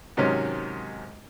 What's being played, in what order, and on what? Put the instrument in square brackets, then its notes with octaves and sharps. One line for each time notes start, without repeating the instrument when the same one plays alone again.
[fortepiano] G#2 C3 D#3 F#3 C#4